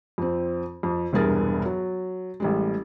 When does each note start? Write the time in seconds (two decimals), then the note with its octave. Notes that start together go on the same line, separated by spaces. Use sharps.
0.18 F2 C4
0.83 F2
1.13 E1 C2 G2 G#4 A#4 A6
1.65 F#3
2.40 A1 G3 G#3